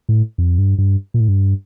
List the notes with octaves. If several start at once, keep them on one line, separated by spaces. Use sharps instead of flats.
A2
F2
G2
G2
A#2
A2
G2